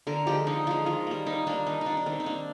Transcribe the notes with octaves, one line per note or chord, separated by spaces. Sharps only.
D3 A#4
F3 G#3 G4
D3 D#4
F3 G#3 F4
D#3 F4
G3 A#3
D#3 D#4
G3 A#3 D4
D#3 D#4
D#4
A#3 D4
D4
D#3 C4
D#4
A#3 D4